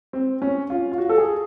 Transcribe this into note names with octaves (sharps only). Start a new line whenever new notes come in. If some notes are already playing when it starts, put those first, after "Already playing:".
C4
C#4
F4
F4
F#4
A4
G#4